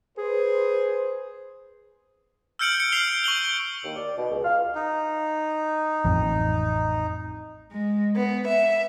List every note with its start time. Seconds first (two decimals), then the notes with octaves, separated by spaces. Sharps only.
0.18 G#4 B4 C5
2.59 E6 F6 G6 C#7 D7 F#7
2.80 C#7
2.92 F6 C7 D7 F7 G7
3.24 C#6 D7 F#7 G7
3.84 D#2
3.96 D5
4.18 B2
4.31 C#2
4.44 F5
4.75 D#4
6.05 A1 F2
7.71 G#3
8.15 B3
8.48 E5